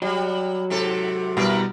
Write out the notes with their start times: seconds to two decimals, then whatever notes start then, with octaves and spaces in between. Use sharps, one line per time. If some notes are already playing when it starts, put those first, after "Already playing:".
0.02 F#3 G3
0.70 G#2 C3 A4
1.37 B2 G3 E4 A#4 B4